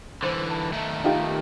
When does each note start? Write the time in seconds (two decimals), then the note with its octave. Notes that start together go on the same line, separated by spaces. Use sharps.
0.23 D3 E3 C5
0.50 A5
0.72 D#3 A3
1.04 D#4 F4 G4